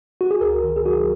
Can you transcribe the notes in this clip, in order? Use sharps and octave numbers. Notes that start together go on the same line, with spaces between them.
F#4
G#4
C#2 A#4
D#3
G#4
F#3 F#4